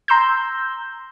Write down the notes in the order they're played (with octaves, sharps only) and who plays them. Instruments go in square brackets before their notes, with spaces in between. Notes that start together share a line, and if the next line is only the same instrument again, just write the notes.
[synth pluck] A#5 C6 E6 G6